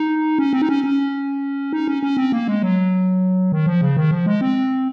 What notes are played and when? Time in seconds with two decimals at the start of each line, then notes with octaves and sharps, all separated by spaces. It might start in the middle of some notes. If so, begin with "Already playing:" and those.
Already playing: D#4
0.38 C#4
0.53 C4
0.62 D#4
0.69 C#4
0.84 C#4
1.73 D#4
1.88 C#4
2.03 C#4
2.17 C4
2.32 A#3
2.48 G#3
2.62 F#3
3.52 D#3
3.66 F3
3.81 C#3
3.97 D#3
4.11 F3
4.26 G#3
4.41 C4